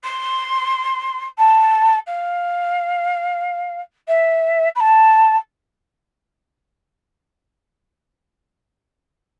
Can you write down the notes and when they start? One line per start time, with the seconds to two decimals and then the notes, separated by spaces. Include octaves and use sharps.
0.03 C6
1.38 A5
2.06 F5
4.07 E5
4.75 B5
4.80 A5